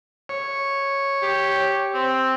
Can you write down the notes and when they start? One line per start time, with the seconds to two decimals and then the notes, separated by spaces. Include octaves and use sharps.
0.29 C#5
1.22 G4
1.94 C4